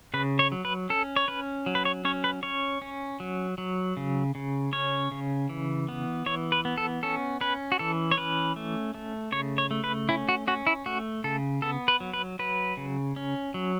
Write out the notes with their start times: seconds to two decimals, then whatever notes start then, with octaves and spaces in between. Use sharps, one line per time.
0.14 C#3 B4
0.39 C#5
0.52 F#3
0.65 B4
0.90 C#4 A4
1.16 C#5
1.28 C#4 B4
1.66 F#3
1.75 B4
1.85 C#5
2.05 C#4 C#5
2.24 B4
2.43 C#4 C#5
2.82 C#4
3.20 F#3
3.58 F#3
3.97 C#3
4.35 C#3
4.73 C#4 C#5
5.12 C#3
5.50 E3
5.88 B3
6.26 E3 C#5
6.52 B4
6.65 B3
6.78 A4
7.03 C#4 A4
7.41 C#4 B4
7.72 F#4
7.79 E3 A4
8.11 C#5
8.17 C#4 B4
8.56 A3
8.94 A3
9.32 C#3 C#5
9.58 C#5
9.71 A3
9.84 B4
10.09 C#4 E4
10.29 F#4
10.47 C#4 F#4
10.67 E4
10.86 A3 F#4
11.24 C#3 A4
11.62 B3 A4
11.88 B4
12.00 F#3
12.13 B4
12.39 F#3 B4
12.77 C#3
13.16 C#4
13.54 F#3